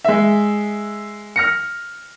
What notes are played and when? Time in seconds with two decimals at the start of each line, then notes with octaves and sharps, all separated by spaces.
0.04 G#3 E5
1.36 F6 A#6 C#7